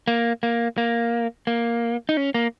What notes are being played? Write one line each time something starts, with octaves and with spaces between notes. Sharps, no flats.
A#3
A#3
A#3
A#3
D#4
C#4
A#3